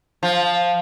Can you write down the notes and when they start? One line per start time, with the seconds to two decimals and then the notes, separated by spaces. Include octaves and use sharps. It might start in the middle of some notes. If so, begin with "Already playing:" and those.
0.23 F3